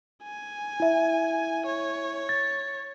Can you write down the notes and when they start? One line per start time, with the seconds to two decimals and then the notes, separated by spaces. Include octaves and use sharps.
0.23 G#5
0.80 E4 E5
1.66 C#5
2.29 A6